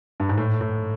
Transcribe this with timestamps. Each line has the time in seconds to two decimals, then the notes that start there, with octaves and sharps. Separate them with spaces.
0.20 G2
0.29 G#2
0.38 A2
0.61 A2